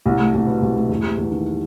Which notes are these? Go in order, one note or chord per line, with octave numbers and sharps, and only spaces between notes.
C2
A3
C2
B2
C2
A3
E2
G3
E2
D#3